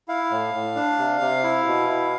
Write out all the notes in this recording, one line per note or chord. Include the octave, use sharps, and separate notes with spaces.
E4 F5
A2
A2
D4
C3
C3
E4
B2
E4